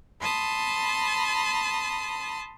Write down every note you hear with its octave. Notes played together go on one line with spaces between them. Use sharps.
A5 B5 C6 D#6